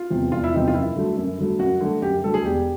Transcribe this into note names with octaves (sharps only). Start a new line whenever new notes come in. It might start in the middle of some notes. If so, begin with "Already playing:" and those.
Already playing: F4
E2 C3 F3
E1 F4
E4
E2 C3 F3 D#4
F4
F#2 E4
D3 F#3 A3
F#2
D3 F#3 A3
F#2 F#4
D3 F#3 A3
F#2 G4
D3 F#3 A3 A4
G#4
E1 G4